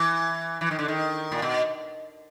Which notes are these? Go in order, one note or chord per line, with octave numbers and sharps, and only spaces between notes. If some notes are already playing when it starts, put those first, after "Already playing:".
Already playing: E3
E3
D#3
D3
D#3
A#2
B2